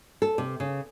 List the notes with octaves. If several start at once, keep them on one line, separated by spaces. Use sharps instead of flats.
A4
C3
C#3